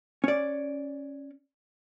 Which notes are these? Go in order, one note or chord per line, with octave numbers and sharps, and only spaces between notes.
C#4 D5